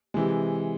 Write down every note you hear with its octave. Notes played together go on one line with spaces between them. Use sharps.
C3 E3 G#3